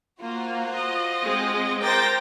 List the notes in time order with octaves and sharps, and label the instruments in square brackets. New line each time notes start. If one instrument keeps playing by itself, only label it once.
[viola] A#3 [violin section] F4 F#4 C5
[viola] D#5
[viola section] G#3 C4
[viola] A#4 C5 [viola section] G5 [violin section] D6 A6 A#6